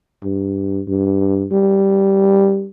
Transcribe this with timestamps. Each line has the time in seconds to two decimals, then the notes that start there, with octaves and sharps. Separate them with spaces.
0.23 G2
0.88 G2
1.52 G3